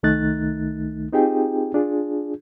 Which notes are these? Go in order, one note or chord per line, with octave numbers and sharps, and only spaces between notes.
C2 D#3 A3 D#4 F#6 A6
C4 D#4 F4 G4 G#4 G5
D4 F4 G#4